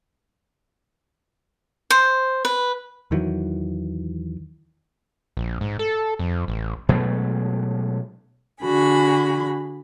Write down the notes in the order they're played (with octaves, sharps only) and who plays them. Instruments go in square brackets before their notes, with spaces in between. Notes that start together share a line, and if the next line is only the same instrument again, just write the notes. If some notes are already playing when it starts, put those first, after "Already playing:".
[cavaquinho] C5
B4
[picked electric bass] E2 D#3 E3 F#3
[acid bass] A#1
G#2
A4
F2
A1
[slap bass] B2 F#3 G#3 A3
[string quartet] D3 F#4 G#4 B5